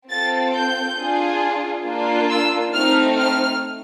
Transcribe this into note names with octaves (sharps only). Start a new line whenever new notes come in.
C4 F4 A4 A6
G6
D4 F4 G#4
A#3 D4 F4
E6
A3 C4 D#4 F6
F6